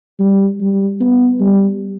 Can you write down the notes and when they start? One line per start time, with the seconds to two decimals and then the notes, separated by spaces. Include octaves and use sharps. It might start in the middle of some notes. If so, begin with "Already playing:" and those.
0.20 G3
0.60 G3
1.00 B3
1.40 G3